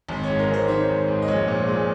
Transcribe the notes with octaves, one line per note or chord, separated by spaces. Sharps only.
G#1
C#5
G#2
A#4
G#1 C5
D#3 C#5
G#1
G#2
D#5
A#1 C#5
A#2 C5
A#2 G#4